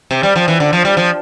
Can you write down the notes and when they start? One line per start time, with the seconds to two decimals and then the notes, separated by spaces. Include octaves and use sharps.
0.11 C3
0.23 G3
0.36 F3
0.48 E3
0.60 D3
0.73 F3
0.85 G3
0.97 F3